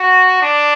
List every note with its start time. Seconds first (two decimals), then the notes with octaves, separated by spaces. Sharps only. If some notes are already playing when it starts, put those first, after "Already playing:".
Already playing: F#4
0.41 D4